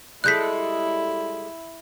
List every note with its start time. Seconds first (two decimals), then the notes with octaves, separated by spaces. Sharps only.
0.24 G3 G#3 E4 A4 F#6 G6 B6